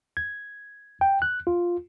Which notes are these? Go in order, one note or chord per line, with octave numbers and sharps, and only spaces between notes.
G#6
G5
F#6
F4